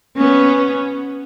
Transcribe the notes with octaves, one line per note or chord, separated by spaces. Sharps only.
B3 C#4